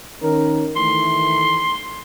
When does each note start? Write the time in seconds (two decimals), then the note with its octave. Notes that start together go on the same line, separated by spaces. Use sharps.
0.21 D#3 C#4 A#4
0.76 D#3 E3 A3 C6